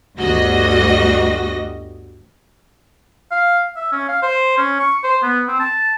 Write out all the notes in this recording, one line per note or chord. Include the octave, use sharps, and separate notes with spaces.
G1 D2 G3 F#4 D#5 A#6
F5
E5
C#4
F5
C5
C#4
C#6
C5
B3
C4
A5